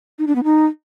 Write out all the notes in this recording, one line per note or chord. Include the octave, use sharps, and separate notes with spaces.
D#4
D4
B3
D#4